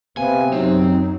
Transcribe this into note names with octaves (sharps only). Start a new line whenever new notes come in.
C3 B3 F5 G#5
F#2 F#3 C4 D#4